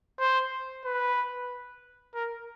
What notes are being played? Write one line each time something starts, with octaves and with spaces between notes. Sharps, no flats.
C5
B4
A#4